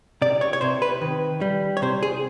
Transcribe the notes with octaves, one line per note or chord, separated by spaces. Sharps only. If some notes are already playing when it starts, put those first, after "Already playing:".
C3 D5
C#5
C#5
C3 C5
B4
D#3
G3
C#5
C3 C5
G#4